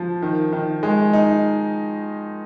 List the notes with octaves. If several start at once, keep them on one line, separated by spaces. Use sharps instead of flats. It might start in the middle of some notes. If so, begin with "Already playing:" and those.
Already playing: F3
D#3
D#3
G#3
D#4